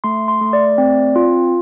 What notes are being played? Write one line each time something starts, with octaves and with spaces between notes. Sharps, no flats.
A3 C6
C6
A3
D5
C4
F4